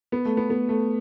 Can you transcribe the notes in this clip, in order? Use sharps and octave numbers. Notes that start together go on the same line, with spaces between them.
B3
A3
B3
B3
A3